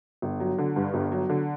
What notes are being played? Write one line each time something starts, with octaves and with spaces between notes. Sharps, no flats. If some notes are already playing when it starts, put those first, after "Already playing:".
G1
F#3
D3
G2
G1
F#3
D3